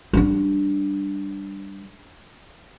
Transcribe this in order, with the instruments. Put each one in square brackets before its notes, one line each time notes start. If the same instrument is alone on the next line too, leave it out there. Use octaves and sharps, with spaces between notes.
[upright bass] G3 D4